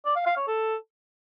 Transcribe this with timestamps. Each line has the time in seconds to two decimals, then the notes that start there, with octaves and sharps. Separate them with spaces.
0.06 D5
0.16 F5
0.26 F5
0.37 C#5
0.47 A4